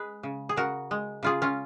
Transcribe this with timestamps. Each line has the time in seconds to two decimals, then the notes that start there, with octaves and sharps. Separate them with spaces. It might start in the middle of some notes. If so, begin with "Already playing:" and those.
Already playing: G#3 G#4 B4
0.23 C#3
0.49 G#4
0.56 C#3 F#4 A#4
0.91 G#3
1.23 C#3 F4 G#4
1.42 C#4 F4